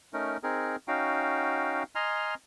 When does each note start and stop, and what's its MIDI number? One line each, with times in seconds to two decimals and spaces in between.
0.13 0.37 57
0.13 0.37 61
0.13 0.37 63
0.13 0.37 70
0.43 0.76 60
0.43 0.76 63
0.43 0.76 68
0.43 0.76 70
0.88 1.83 61
0.88 1.83 63
0.88 1.83 66
0.88 1.83 77
0.88 1.83 79
1.95 2.34 75
1.95 2.34 80
1.95 2.34 82
1.95 2.34 84
1.95 2.34 89